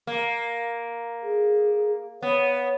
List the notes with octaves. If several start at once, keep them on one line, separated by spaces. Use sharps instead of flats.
A#3
G#4
B3 C#5